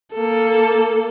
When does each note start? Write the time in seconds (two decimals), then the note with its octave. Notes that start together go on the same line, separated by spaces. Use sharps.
0.13 A#3 A4